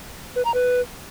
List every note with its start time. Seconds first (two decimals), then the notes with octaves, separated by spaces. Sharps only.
0.36 B4
0.45 A#5
0.54 B4